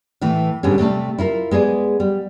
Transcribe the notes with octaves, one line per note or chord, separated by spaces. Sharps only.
A2 E3 A3
G#2 D3 G3 G#3 B3 C#4
C3 G3 A3 A5
E4 F4 A#4
G#3 B3 G#4 D5
G3